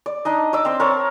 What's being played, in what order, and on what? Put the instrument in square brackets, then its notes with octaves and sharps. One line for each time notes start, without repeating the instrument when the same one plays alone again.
[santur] D5
D4 D#4 D#5
D5 D6 E6
C4 C6
A#4 C#5 A5